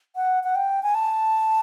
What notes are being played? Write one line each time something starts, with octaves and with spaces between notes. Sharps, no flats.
F#5
F#5
G5
G#5
A5